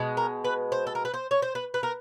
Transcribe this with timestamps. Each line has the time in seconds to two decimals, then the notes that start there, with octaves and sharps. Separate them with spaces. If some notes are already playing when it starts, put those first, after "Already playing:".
Already playing: B2 G#3
0.17 A#4
0.44 B4
0.72 C5
0.87 A4
0.95 A#4
1.05 B4
1.14 C5
1.31 C#5
1.42 C5
1.55 B4
1.74 B4
1.83 A#4